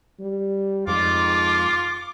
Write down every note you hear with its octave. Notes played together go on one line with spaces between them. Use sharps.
G3
F2 G#2 F4 D6